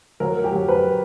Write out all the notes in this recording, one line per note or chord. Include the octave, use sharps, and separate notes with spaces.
F#3 A#4
G4
F#3
B4